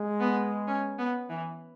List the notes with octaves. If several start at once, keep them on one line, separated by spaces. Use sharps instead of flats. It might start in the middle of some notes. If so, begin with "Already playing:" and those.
Already playing: G#3
B3
C#4
B3
E3